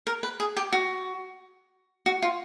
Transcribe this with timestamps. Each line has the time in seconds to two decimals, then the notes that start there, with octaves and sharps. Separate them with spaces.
0.07 A#4
0.23 B4
0.40 G#4
0.57 G4
0.73 F#4
2.06 F#4
2.22 F4